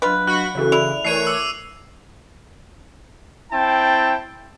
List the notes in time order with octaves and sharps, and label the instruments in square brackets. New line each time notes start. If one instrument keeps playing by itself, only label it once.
[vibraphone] F#3 D4 D#5 [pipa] F4 B4
[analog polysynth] F#4 F#5 B5 [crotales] F#6
[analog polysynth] C#3 E3 [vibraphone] C#4 F#4 A4
[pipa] E4 [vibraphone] D5 E5 [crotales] F7
[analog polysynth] E3 A3 C#5 [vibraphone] A#4 D5 [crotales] C7 D#7 F7
[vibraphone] D6 [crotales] E6
[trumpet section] C4 E4 G5 A5